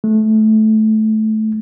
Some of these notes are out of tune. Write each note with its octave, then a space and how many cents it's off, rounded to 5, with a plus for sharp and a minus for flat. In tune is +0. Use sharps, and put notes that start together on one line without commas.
A3 -15